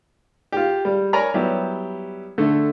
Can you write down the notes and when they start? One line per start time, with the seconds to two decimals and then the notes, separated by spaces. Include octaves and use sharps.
0.52 F4 G4
0.85 G3
1.13 A#4 C#5 D5 G#5 A#5 B5
1.34 F#3 G3 B3 E4 G4
2.38 D3 A3